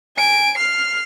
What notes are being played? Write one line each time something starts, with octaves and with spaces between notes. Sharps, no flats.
G#5 D7
F6 C7